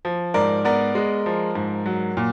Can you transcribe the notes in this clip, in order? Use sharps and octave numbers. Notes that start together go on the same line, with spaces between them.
F3
G#2 A#4 D5
B3 A#4 D5
G#3
F3
G#2
F#3
A#2